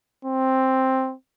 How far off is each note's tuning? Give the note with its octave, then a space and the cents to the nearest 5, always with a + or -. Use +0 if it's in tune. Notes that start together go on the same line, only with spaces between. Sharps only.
C4 +5